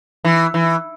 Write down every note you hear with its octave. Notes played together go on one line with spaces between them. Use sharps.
E3
E3